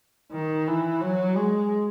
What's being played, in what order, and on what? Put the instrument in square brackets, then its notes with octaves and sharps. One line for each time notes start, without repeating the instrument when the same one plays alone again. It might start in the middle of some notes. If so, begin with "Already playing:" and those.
[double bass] D#3
E3
F#3
G#3